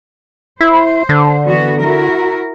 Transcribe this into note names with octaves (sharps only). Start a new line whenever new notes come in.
E4 C5
D3
E3 B3 F#4
E4 F#4 A#4